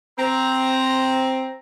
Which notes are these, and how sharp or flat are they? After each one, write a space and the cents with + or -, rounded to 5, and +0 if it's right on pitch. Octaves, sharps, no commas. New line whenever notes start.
C4 +0 A#5 +0